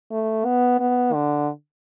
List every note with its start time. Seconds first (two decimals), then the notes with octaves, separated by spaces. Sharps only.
0.11 A3
0.45 B3
0.80 B3
1.13 D3